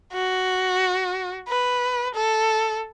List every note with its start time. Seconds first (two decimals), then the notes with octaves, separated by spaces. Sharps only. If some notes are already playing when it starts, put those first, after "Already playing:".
0.13 F#4
1.48 B4
2.15 A4